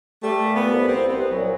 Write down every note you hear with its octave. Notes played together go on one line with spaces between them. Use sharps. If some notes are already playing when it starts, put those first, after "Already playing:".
G3 A3
A#2
B3
C2
C2 C4
C2 B3
A#2 F#3